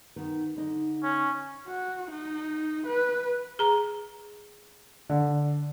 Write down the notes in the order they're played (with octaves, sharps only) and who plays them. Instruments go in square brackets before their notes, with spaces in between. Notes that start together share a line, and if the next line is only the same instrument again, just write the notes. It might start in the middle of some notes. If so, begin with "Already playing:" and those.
[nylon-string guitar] D#3 B3
D3 D#4
[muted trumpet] C#4
[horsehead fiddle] F#4
D#4
B4
[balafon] G#4 A#5
[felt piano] D3